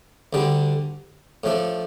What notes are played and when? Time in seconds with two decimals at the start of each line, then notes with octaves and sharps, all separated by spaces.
0.33 D2 D3 G3 D4
1.44 A2 F3 A3 D4